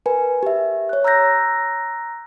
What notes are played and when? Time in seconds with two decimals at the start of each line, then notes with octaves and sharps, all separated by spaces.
0.06 A#4 B4 G#5
0.43 G4 E5
0.89 C#5 F#6
1.04 A#5 E6 F#6 G6 A#6